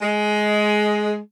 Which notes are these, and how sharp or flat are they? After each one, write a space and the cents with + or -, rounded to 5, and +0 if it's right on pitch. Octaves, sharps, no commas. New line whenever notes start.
G#3 +15